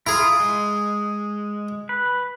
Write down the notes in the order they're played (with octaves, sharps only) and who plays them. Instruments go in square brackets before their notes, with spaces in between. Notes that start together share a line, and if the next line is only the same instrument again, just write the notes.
[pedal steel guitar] E4 F4 [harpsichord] G#4 A#5
[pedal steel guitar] G#3
B4